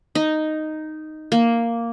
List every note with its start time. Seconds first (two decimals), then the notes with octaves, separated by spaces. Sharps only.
0.15 D#4
1.32 A#3